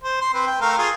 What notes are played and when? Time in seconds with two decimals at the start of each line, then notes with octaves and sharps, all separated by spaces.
0.03 C5
0.21 C6
0.34 C4 B4
0.47 G5
0.61 A3 A#4 F5
0.78 F4 G#4